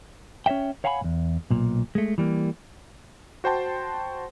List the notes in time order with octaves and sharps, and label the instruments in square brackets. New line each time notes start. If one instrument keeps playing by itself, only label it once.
[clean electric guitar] C#4 C#5 D#5 E5 G5
C#5 F5 F#5 G#5 A5 B5
E2 G#2
B1 A#2
G#3 A3
E3 G3 A#3
[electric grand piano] F#4 C5 G5 A5 C6